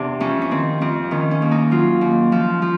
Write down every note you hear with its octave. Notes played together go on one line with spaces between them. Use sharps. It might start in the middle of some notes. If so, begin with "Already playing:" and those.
Already playing: E2 C3 D4
F2 C#4
C#4
D#3 C4
F2 C4
D#3 C#4
C#4
D#2
D#4
F#3 F4
D#2
F3
F3